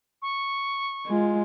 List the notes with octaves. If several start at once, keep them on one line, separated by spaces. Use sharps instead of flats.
C#6
G#3 F4